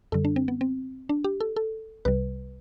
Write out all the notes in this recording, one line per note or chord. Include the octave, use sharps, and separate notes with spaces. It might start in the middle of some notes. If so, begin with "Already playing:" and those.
F#2 D3 G3 A4
D4
C4
B3
C4
D4
G4
A4
A4
C2 C3 G3 B4